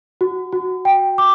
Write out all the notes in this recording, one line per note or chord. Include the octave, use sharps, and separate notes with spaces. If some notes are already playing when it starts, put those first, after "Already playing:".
F#4
F#4
G5
D6